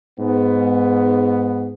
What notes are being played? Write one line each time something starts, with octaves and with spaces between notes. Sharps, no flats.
G#2 B3